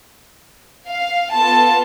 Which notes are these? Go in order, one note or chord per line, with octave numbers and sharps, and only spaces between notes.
F5
B3 F4 A4 A5